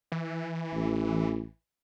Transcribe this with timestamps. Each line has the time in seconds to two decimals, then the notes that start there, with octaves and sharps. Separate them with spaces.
0.12 E3
0.73 A1